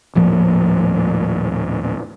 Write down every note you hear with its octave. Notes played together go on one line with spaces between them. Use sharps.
D#1 A2 F3 A#3